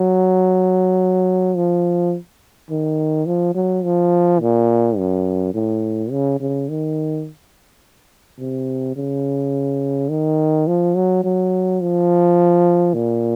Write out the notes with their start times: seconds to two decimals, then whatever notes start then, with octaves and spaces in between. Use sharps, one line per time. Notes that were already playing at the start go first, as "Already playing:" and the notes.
Already playing: F#3
1.56 F3
2.70 D#3
3.26 F3
3.55 F#3
3.84 F3
4.40 A#2
4.98 F#2
5.54 A2
6.11 C#3
6.40 C#3
6.69 D#3
8.39 C3
8.96 C#3
10.09 D#3
10.67 F3
10.96 F#3
11.24 F#3
11.81 F3
12.94 A#2